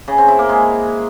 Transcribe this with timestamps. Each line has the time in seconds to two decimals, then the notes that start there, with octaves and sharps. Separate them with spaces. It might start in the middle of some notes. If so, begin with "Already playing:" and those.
0.08 C#3
0.18 C4
0.28 E4
0.39 A#3
0.49 G#3